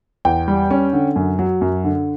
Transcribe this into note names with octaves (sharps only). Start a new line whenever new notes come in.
E2 G5
G3
C#4
D3
F#2
F#3
F#2
D3